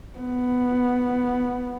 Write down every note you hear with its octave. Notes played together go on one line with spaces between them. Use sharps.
B3